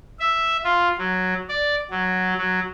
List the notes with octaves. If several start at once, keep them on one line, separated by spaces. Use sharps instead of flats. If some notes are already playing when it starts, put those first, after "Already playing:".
E5
F4
F#3
D5
F#3
F#3